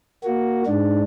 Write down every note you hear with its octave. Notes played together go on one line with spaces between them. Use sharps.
A#3 F#4
G#2 D4